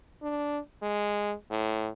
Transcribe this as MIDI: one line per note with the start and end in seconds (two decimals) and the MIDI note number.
0.22 0.59 62
0.82 1.33 56
1.50 1.89 45